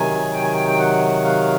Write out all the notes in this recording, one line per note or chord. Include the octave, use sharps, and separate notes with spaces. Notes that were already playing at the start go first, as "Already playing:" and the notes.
Already playing: C3 D#3 F#3 G#5
G5
G#5
G5
G5
F#5
F5